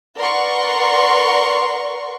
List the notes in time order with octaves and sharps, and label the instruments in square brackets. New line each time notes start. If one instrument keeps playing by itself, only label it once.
[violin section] A#4 B4 D5 F#5 C6 C#6